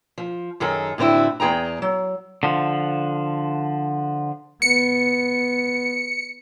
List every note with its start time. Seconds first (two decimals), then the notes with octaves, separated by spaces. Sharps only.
0.18 F3
0.60 F#2 D#3 G#4 A4
0.98 A2 D3 C4 E4 F#4
1.40 E2 G#4 G5 A#5
1.82 F#3
2.43 D3 F3
4.62 B3 C#7